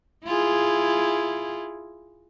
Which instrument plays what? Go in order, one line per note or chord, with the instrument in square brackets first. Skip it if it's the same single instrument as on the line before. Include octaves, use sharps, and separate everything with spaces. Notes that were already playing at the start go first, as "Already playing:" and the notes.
[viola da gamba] E4 F4 G#4